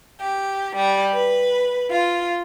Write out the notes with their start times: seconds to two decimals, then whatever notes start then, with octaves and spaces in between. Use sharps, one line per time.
0.19 G4
0.75 G3
1.13 B4
1.90 F4